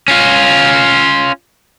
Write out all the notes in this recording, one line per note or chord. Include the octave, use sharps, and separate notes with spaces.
C#4 F4